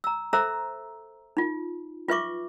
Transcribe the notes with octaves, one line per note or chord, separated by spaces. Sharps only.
A#5 E6
A4 C5 E5 A#5 E6
D#4 F4
F4 B4 E5 C#6 D6